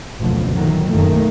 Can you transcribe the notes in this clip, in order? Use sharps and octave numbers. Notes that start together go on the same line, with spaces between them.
F#1 D2 B2 D3 F3
A#2 D#3 E3 F#3
B1 F#2 A#2 D#3 A3 A#3